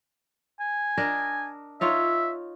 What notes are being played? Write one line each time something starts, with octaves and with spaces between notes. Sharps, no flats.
G#5
D4 A#4 D#5
D#4 F4 C#5 E5